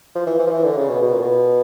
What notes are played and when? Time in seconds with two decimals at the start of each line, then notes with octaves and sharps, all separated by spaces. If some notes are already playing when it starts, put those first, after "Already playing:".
0.15 F3
0.26 E3
0.39 E3
0.47 F3
0.51 E3
0.64 D3
0.77 C#3
0.89 B2
1.02 B2
1.13 A#2
1.20 B2